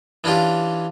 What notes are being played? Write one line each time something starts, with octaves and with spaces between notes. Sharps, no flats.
E3 C#4 D4 F4 G4